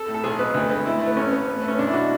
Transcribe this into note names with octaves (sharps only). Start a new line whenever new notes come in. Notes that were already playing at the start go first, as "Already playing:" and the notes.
Already playing: A4
A2
A4
B1 G#4
B2 B4
D2 B4
G#3 B4
A3 E4
A3
B3
A1 C#4
A1 B3
A3 B3
B3
A3 C#4
B1 D4
E4
B2 F#4